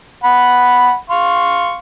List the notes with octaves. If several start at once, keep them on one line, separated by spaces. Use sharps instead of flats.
F#5 B5
F5 C6 C#6